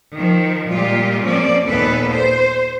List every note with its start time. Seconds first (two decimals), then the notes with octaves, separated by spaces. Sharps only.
0.15 D#3 F3
0.71 A#2 G3 G#3 F4 G4
1.24 F3 A#3 C4 C#4 D5
1.68 D#2 A#2 B3 A4 B4
2.12 C5